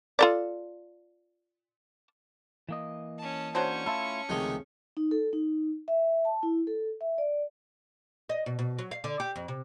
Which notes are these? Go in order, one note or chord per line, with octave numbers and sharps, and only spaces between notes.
F4 A4 D5
E3 A#3 D#5
C#4 A5
F#3 C#4 D4 C5 C#6
A3 E4 F4 A4
C#2 C3 D#3 F3 G#3 A3
D#4
A4
D#4
E5
A5
E4
A4
E5
D5
D#5
B2
B2
F#3
F5
D3
G4
F2
C3